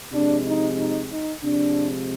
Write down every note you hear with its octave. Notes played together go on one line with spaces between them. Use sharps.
C3 F3 G#3 D4
D#4
D#4
D#4
C3 F3 G#3 D4